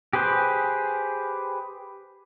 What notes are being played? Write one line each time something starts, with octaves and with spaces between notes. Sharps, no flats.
G4 G#4 B4 C5